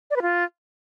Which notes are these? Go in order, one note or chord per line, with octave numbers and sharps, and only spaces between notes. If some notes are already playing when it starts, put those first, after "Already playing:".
D5
B4
F4